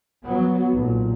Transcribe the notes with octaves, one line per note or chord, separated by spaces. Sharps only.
F#3 B3
B1 A#2